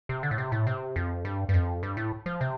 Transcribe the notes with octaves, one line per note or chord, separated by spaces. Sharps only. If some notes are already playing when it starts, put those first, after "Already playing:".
C3
D3
A2
C3
A2
C3
F2
G2
G2
F2
G2
A2
F3
C3